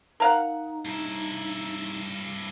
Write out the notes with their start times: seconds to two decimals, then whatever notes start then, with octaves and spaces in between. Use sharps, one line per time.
0.20 D#4 A#4 F5 F#5
0.85 G2 E4